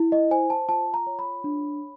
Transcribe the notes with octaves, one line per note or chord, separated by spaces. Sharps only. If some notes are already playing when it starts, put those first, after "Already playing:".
Already playing: E4
D#5
C5 G#5
A5
F4 A5
A#5
C#5
B5
D4